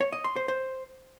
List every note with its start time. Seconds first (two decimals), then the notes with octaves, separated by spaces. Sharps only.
0.01 C#5
0.12 D#5
0.24 C6
0.36 C5
0.48 C5